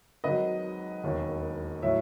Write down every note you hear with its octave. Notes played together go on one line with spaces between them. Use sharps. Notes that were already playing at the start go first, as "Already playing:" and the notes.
G#1 G#2 D#3 F#3 B4 D#5
E1 D#2 D#3
A2 F#3 C#5 E5